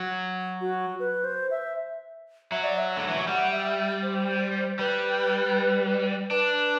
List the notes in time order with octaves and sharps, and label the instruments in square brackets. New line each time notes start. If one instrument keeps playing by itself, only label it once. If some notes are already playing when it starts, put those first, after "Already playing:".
Already playing: [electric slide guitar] F#3
[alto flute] F#4
B4
C5
E5
[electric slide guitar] F#3 [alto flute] E5
[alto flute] D5
E5
[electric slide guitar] D3
E3
F#3
[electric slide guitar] G3 [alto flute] F#5
[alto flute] E5
C5
[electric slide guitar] G3 [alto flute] B4
[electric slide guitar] D4 [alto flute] B4